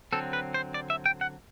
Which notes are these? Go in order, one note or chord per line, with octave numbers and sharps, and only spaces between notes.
D3 F#3 C4 A4
B4
C5
D5
E5
G5
F#5